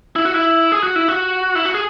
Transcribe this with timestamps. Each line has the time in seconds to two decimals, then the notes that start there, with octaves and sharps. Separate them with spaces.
0.16 E4
0.25 F#4
0.34 E4
0.72 G#4
0.83 F#4
0.96 E4
1.08 F#4
1.55 E4
1.65 F#4
1.74 G#4